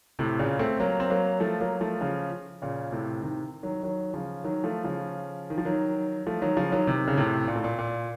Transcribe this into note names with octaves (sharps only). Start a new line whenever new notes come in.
A2 C3
A#2 C#3
A3 C4
F#3 A#3
C4
F#3 A#3
F3 A3
F#3 A#3
F3 A3
C#3 F3
A#2 C#3
A2 C3
C3 D#3
D#3 F#3
D#3 F#3
C#3 F3
D#3 F#3
F3 A3
C#3 F3
D#3
F3
D#3 F#3
F3 A3
D#3 F#3
C#3 F3
D#3 F#3
C3 D#3
C#3
A2 C3
A#2
A2
A#2
A#2